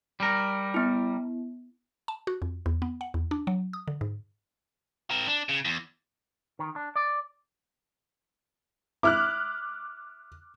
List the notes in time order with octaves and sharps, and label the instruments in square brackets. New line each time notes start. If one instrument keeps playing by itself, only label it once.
[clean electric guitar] G3 A#4
[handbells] B3 E4
[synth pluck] A5
F#4
F2
E2
B3
F#5
E2
D4
F#3
D#6
D3
G#2
[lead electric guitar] C4 A#4
D4
C#3
E2
[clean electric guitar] D#3
D4
D5
[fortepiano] E4 [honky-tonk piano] D6 F6 F#6